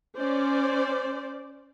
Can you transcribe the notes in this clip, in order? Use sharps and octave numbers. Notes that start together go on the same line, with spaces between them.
C#4 C5 D5